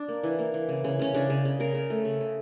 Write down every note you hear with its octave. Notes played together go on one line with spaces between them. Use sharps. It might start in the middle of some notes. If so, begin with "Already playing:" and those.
Already playing: D4
A#3
E3
A#3
E3
C#3
C#3
C#3 C#4
C#3 D4
C#3
C#3
C#3 A#4
C#3
A3
C#3
C#3